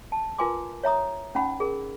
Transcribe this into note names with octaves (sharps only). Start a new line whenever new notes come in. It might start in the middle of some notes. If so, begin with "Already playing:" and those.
A5
F4 A#4 B4 G#5 C6 D6
C#5 E5 A#5 D#6
C#4 D#4 F#5 B5
G#4 A#4